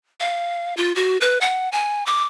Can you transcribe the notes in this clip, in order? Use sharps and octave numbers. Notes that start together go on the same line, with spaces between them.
F5
F4
F#4
B4
F#5
G#5
D6